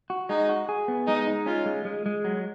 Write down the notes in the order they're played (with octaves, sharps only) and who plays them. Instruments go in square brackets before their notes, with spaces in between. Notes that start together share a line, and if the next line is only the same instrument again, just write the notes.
[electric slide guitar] F#4
[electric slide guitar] G#3 [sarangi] D#4
[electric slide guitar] F#4
G#4
B3
[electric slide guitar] G#3 [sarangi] D#4
[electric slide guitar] D#4
[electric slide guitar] C#4 [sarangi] F4
[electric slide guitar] G#3
G#3
G#3
F#3